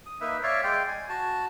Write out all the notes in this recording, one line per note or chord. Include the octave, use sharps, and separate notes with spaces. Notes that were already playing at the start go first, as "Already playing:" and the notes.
D#6
A#3 D#4 B4 E5
C#5 D5 E5 F5
G#3 D5 F5 G5
G#5
F#4 A5